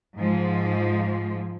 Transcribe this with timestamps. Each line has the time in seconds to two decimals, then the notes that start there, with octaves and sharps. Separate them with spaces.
0.18 G#2 F3 G#3